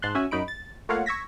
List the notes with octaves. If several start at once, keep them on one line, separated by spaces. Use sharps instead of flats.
G#2 A5 C6 F#6
C#4 F#4 E5 G#5
F#2 F#3 D#4 B5 D7
A6
A3 A#3 F4 C#5 F5 F#5
C#6 E6 G#6 A#6 B6